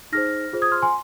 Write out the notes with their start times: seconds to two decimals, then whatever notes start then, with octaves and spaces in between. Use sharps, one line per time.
0.12 D#4 G#4 C5 F6 A#6
0.53 F4 G#4 C5
0.62 D#6 G#6
0.72 C6 F6
0.82 G#5 C6